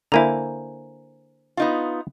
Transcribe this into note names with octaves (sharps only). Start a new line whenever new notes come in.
D3 A#3 E4 C5 G#5 A#5
B3 D#4 F4